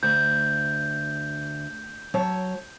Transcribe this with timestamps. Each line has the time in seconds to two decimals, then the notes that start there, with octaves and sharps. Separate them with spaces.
0.03 D2 G6
2.14 F#3 C#5 A5